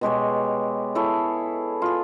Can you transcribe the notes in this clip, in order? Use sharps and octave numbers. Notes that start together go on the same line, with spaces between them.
B2 G#3 G4 C#5
E4 G#4 A4 C#5
F4 G#4